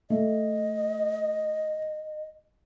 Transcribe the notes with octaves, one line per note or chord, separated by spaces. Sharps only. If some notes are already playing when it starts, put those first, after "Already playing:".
A3 D#5